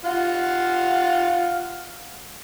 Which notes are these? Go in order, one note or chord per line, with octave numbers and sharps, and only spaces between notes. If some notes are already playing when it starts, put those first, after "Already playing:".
F4 F5 F#5